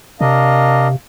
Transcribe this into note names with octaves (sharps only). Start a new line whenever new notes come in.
C3 D4 A#4 D#5 F5